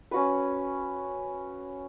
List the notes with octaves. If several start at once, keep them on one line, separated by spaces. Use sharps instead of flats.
C#4 F#4 B4